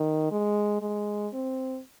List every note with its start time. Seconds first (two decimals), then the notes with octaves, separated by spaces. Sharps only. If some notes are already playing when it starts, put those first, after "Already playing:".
Already playing: D#3
0.31 G#3
0.82 G#3
1.33 C4